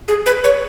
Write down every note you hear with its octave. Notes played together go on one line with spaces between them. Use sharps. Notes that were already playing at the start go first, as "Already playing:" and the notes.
G#4
B4
C#5